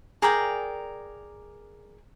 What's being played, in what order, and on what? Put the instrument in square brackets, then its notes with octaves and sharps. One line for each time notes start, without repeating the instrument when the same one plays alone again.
[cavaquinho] G#4 A#4 D5 G5